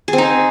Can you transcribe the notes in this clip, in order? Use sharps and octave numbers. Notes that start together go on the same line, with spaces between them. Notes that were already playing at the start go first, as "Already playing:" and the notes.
G#4
C4
D#4